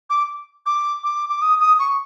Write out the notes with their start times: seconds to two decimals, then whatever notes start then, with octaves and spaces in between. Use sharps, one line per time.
0.10 D6
0.66 D6
1.04 D6
1.30 D6
1.42 D#6
1.60 D#6
1.79 C#6